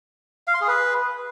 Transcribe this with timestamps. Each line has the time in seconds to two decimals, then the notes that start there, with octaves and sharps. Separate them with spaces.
0.48 F5
0.54 C6
0.61 G#4
0.68 B4